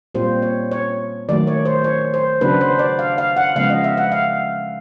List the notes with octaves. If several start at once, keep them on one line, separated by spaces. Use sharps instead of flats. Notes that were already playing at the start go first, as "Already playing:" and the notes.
A#2 G3 C4 F4 C5
C#5
C#5
D#3 F#3 A3 D5
C#5
C5
C#5
C5
C#3 F#3 B3 D4 B4
C5
D5
F5
F5
F#5
C#3 F3 G#3 B3 F5
D#5
E5
F#5
F5